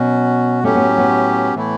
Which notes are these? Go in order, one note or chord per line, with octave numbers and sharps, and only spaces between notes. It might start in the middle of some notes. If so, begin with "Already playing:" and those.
Already playing: B2 F#3 C#4 F#4
A2 F#3 A3 C#4 G4
B3
B3
A2 E3 A3 E4